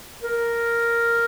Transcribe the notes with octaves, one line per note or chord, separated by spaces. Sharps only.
A#4